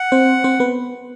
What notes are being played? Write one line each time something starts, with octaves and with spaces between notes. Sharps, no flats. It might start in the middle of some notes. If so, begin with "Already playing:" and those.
Already playing: F#5
C4 C5
C4 C5
B3 B4